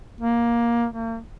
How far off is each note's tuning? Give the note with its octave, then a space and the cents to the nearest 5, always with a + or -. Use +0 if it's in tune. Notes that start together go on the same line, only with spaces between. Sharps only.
A#3 +15
A#3 -40